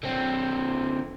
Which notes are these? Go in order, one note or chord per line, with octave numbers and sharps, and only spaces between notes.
D3 C4